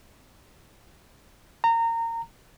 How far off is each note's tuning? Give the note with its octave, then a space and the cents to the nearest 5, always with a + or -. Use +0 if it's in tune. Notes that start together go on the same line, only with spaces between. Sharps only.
A#5 -25